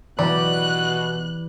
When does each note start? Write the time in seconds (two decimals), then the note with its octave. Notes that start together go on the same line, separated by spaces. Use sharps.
0.19 B2 E3 G3 G4 D5 F#6